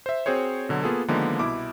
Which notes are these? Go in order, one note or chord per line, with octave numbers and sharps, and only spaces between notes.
C5 E5
C4 F#4 G#4 C5 C#5
B2 D3 F#3
A#3 B3 F4 G#4 A4
D3 D#3 F3 G#3 A#3 B3
C2 B2 E4 D6